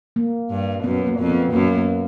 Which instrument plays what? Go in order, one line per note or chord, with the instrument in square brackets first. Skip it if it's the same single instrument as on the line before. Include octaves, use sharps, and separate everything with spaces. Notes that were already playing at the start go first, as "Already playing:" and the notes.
[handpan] A#3
[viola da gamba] G2
[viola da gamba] F#2 [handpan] B3
[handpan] A#3
[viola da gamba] F2
[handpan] B3
[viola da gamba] F#2 [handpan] A#3
[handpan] A#3